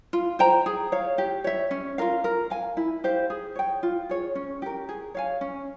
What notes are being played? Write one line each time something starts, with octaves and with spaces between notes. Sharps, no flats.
F4
C5 G5 A#5
G#4
C#5 F5
G4
C#5 E5
C#4
F4 A#4 F5
A#4
F5 G#5
E4
G4 C5 F5
G#4
C#5 G5
F4
G#4 C#5
C#4
G4 A#4
G#4
C#5 F5 G#5
C#4